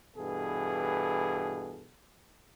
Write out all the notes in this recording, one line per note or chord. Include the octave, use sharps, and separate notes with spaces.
G2 B2 E3 G#4 A4